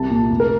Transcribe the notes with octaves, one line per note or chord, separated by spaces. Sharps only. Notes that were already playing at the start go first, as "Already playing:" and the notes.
Already playing: C2 A5
A#2
F1
A#4